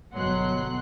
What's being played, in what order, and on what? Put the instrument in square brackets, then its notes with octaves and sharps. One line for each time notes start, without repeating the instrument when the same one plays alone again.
[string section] G1 B2 [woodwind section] F#3 [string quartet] F#5 C6 F#6